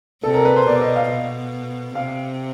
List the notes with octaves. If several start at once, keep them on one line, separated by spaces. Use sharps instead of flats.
C3 A4
A#4
B4
C5
B2 D5
D#5
F5
B2
C3 F5